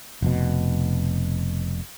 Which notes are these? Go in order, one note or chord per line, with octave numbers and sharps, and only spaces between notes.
F1 B2